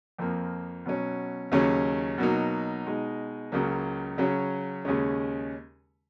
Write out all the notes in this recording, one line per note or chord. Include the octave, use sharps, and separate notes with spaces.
F2 F3 A#3
B2 F#3 C#4
D#2 C#3 F#3 C#4
B2 F#3 A#3 D#4
B2 G#3 D#4
C#2 C#3 F#3 A#3
C#3 F#3 C#4
D#2 C#3 G#3 C#4